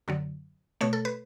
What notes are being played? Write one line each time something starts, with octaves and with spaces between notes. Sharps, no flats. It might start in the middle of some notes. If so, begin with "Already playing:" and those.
F#2 D3 F#3
B2 A3 C#5
A4
B4